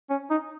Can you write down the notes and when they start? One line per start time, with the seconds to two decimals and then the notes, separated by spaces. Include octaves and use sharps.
0.10 C#4
0.30 D#4